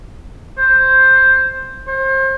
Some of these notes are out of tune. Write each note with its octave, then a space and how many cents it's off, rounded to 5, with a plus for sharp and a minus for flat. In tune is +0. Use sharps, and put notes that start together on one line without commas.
C5 +5
C5 +30